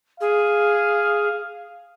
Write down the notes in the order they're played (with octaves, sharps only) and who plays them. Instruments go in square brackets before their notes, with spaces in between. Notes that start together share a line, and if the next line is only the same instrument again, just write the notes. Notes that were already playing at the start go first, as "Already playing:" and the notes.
[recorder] G#4 [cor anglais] F5